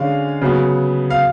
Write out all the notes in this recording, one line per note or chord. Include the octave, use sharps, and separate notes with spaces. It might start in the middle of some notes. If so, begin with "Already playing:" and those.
Already playing: D3 G#3 C#4 F5
C#3 F#3 B3
F5